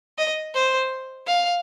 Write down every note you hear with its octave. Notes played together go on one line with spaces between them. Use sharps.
D#5
C5
F5